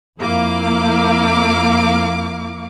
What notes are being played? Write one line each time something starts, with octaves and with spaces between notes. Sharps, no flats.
F2 A#3 E4 F5 D6